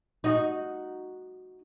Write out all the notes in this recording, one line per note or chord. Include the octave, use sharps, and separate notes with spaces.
D#4 F#4